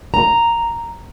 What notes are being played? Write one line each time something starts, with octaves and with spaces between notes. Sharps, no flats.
A#5